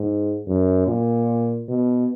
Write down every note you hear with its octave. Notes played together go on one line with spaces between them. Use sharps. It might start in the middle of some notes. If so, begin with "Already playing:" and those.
Already playing: G#2
F#2
A#2
B2